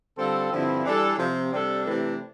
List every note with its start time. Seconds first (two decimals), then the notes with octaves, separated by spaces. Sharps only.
0.18 D3 G3 C4 F4 A4
0.52 G2 D3 F3 C4 E4
0.85 E3 G3 D4 A4
1.18 C3 F3 C4
1.51 C3 G3 D4 A4
1.85 C3 E3 A3 D4